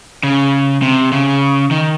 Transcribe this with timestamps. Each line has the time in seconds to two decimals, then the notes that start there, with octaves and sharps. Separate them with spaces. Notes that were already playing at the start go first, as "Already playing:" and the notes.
0.23 C#3
0.82 C3
1.12 C#3
1.71 D#3